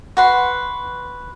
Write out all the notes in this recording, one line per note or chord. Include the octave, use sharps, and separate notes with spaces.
F#4 B4 C6